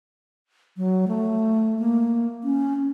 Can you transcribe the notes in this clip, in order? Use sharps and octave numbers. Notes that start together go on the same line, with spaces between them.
F#3
A3
A#3
C#4